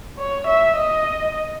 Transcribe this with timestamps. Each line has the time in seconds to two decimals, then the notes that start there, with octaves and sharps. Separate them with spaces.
0.19 C#5
0.47 E5
0.76 D#5